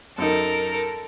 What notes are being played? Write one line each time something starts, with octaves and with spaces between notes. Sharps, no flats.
F#2 D#4 A4 A#4